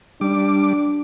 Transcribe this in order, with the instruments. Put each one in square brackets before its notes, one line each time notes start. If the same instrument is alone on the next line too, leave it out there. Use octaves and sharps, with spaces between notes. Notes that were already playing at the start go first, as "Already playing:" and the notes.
[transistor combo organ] G3 D6 [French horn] D4